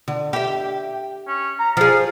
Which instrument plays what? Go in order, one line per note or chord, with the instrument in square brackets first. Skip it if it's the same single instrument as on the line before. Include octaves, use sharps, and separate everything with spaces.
[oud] D3
G4 E5
[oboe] C#4
A#5
[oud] F3 G#4 [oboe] F5